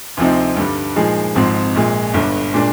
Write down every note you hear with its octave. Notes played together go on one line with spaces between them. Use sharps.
D2 C3 F3 C4 D#4
G2 D3 G3
A#2 F3 G#3 D#4 G#4
G#1 G#2 F3 C4
A#1 A#2 G#3
G1 G2 D3
A#2 G#3 D4